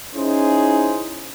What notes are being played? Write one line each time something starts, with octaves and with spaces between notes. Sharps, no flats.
C#4 D#4 E4 G#4 C5